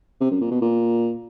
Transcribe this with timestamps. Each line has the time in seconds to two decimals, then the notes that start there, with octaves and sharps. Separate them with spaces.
0.21 C3
0.31 F#2
0.41 A#2
0.51 B2
0.61 A#2